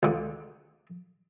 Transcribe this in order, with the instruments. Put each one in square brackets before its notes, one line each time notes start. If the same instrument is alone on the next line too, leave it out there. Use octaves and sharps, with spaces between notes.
[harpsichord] C#2 D3